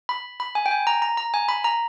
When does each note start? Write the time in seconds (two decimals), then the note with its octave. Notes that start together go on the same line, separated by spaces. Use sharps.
0.09 B5
0.40 B5
0.55 G#5
0.66 G5
0.71 G#5
0.87 A#5
1.02 A#5
1.17 A#5
1.34 G#5
1.49 B5
1.64 A#5